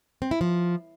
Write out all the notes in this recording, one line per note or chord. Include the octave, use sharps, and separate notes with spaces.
C4
E4
F3